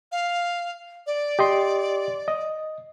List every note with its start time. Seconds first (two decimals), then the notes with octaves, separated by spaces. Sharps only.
0.12 F5
1.07 D5
1.39 G4 D#5 C6
2.28 D#5